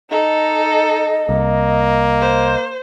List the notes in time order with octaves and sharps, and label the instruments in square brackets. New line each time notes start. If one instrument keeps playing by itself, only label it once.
[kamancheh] D#4 A4 [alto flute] D#5
[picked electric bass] C2 [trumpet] A#3
[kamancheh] C5